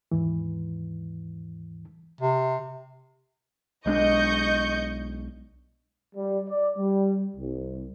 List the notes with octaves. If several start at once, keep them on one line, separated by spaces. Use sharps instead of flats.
D#2 G#2 E3
C3
B1 G#3 D4 D#5 C#6 G6
G3
D5
G3
C2